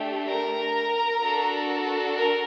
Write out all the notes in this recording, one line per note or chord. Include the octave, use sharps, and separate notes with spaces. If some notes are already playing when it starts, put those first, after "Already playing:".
Already playing: A3 D4 G4
A#4 A#5
D4 F#4 A4
A#4